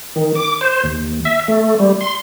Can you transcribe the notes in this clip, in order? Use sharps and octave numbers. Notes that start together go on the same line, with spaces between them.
D#3
D6
C5
D#2
E5
A3
G3
C6